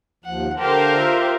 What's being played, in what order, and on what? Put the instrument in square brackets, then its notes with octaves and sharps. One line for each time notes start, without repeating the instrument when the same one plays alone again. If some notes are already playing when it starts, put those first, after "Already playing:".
[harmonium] D#2 F3 [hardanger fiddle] F#5
[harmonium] D3 A5 [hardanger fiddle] G4 F5 [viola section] A#4 C5
[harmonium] F4 E5